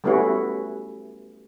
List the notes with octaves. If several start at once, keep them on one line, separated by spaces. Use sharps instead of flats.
G3 A3 B3 C#4 E4 F#4